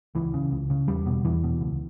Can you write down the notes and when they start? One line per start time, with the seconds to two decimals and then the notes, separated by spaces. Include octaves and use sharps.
0.15 C#2 E3
0.34 C#3
0.52 C#2
0.70 C#3
0.88 E2 G3
1.06 B2
1.25 E2 E3
1.44 B2
1.61 C#2